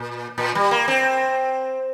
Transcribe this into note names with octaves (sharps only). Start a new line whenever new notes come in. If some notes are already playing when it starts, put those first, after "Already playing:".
Already playing: A#2
A#2
G3
A#3
C4